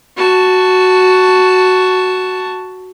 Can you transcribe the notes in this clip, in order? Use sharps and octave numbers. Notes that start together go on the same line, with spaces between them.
F#4 A5